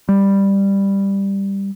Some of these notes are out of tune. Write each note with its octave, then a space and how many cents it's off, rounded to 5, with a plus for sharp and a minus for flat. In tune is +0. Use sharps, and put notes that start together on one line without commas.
G3 +10